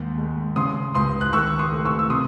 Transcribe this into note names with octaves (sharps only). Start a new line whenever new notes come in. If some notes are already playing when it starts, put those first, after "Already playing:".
Already playing: D#2 G#2 G#3
G#3
C#3 C6 D#6
C#2 C6 D#6
F#6
D#3 C#6 E6
C6 D#6
A3
C#6 E6
E6
C3 C6 D#6